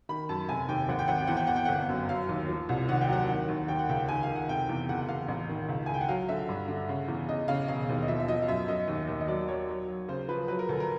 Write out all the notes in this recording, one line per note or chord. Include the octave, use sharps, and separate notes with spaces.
D#3 B5
F#2 A5
F1 G#5
D#2 G5
G#1 F#5
G5
G#1 F#5
G5
E2 F#5
G5
E2 F#5
G5
G1 F#5
F#2
F#3 F5
D#2
F3
C2
D#2 F#5
G5
F#3 F#5
D#3
D#2
D#3 G5
F#5
C#2 G5
D#3 G#5
F5
D#3
F#5
F1 G5
E2
F#1 F#5
F#5
E2 F5
A1
D#3
C#2
C#2 G#5
G5
F#5
F#3 F5
D3 E5
G2
D3
C#3
E2
C#3 D#5
C#3 F5
E1 F5
D#2
D#5
F3 E5
E5
F3 D#5
F5
F#2 E5
F#2 D#5
D#2
D#2
D#5
F#3 D5
F#3 C#5
F#3
F#3
C#3 C5
F3 B4
F#3 B4
A#4
D2 A4
A#4